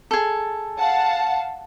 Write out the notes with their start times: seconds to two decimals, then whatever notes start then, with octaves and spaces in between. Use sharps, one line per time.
0.11 G#4 A4
0.78 F5 F#5 A5